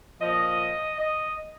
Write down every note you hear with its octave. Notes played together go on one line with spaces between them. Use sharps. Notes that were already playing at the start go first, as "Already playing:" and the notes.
A#2 F3 D#5
D#5